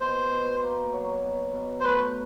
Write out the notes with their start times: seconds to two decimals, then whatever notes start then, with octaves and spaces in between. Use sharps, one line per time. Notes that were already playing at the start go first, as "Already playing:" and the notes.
0.01 B2 C5
0.31 B2
0.62 A#3
0.92 F#3
1.23 B2
1.53 B2
1.81 C5
1.84 A3 B4